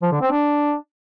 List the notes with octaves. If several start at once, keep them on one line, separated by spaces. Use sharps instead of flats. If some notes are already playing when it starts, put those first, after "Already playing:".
F3
D3
C4
D4